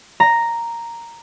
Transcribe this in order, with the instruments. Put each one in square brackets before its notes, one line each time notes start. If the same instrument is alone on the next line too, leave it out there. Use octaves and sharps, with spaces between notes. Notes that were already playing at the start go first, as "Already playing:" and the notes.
[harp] A#5